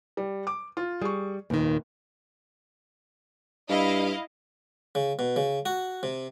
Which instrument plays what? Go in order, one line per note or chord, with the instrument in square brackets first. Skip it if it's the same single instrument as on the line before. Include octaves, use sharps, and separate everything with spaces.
[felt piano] G3
D6
F4
[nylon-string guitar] G3 [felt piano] G#4 C#6
[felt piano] F1 [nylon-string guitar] D#2 A#2 D#3
[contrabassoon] G2 [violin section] E4 D#5 F5
[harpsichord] C#3
B2
C#3
F#4
C3